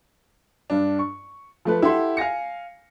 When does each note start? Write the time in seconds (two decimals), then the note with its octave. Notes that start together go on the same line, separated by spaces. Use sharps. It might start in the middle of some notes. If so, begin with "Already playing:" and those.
0.70 G2 D4
0.99 C#6
1.65 F3 A3 B4
1.82 E4 G4 A4 E5 F#5 C6
2.17 F5 G#5 A#6 C#7